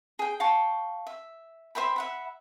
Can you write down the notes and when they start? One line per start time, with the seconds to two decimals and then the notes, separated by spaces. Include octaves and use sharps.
0.19 G#4 G5
0.40 F5 G5 A5 C#6
1.07 E5
1.75 C5 E5 G5 B5
1.96 E5 F#5 B5